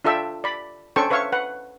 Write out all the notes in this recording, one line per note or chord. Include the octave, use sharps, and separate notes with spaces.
D4 F4 A4 E5 G5 E6
D5 B5
C#4 D4 A4 C5 G5 C#6
B4 C#5 E5 F5 C#6
B4 F#5